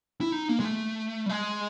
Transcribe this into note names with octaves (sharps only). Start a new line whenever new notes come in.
E4
D#4
A#3
G#3
A3
G3
G#3